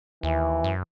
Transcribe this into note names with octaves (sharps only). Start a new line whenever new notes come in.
D#2 E3
F#2